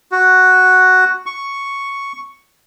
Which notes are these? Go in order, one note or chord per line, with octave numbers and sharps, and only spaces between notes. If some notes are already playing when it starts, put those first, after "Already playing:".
F#4
C#6